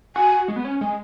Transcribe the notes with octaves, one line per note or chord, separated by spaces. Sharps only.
F#4 G#5
G#3
B3
C#4
G#3 G#5